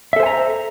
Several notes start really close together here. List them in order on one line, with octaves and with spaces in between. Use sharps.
E5 A4 C5 G#5 A#5